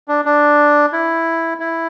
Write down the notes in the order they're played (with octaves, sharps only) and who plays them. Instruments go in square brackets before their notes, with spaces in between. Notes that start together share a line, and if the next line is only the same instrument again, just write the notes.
[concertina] D4
D4
E4
E4